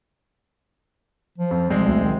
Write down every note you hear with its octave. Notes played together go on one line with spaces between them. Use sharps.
F3
F2
B1 G3 G#3 C4
D2
D#3